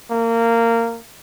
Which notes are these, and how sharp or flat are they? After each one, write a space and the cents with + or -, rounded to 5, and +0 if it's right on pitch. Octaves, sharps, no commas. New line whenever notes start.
A#3 -20